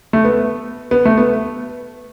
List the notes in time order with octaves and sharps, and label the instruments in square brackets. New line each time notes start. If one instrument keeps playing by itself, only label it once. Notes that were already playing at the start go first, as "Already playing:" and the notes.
[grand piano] A3
B3
B3
A3
B3